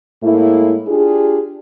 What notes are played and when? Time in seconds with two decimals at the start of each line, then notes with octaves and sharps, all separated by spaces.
0.23 A2 G#3 A#3 E4
0.88 D4 F4 G4 G#4